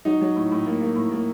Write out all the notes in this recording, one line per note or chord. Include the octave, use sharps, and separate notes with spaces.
F#3 D#4
F#3
A2
A2
A#3
A#3
A2
A#3